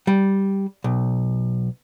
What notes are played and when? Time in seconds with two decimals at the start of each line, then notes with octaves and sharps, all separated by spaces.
0.07 G3
0.84 B1